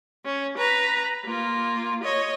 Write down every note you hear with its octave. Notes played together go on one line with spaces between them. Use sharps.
C#4
B4 A#5
A#3 F4
C#5 D#5